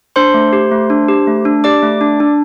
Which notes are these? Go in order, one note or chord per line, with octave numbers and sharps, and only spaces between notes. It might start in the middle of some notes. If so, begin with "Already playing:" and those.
D4 C5 C6
A3
G4
A3
D4
G4
A3
D4
G4 D5 D6
A3
D4
D4